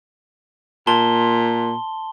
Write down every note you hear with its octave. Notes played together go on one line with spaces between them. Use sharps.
A#2 A5 C6 G7